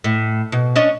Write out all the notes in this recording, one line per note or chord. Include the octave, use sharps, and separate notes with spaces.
A2
B2
C#4 D4 D#5